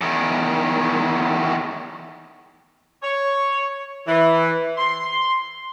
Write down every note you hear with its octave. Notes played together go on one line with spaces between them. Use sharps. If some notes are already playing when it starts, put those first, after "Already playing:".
E2 D#3
C#5
E3
C6